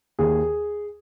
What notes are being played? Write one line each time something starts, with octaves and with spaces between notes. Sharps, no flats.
D#2 G#4